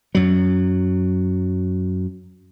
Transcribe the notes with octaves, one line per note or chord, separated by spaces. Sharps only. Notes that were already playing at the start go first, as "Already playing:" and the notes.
F#2 F#3